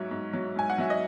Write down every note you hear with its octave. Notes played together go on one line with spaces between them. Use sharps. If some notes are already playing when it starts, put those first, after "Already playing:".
Already playing: G#2 F#3 C#5 E5
G#2
F#3
G#2 G#5
F#5
F#3 E5
D#5